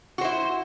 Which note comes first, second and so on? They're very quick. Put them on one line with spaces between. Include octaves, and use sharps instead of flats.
F#4 C5 E4